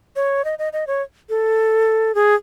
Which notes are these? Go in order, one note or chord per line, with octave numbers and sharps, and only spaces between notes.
C#5
D#5
D#5
D#5
C#5
A4
G#4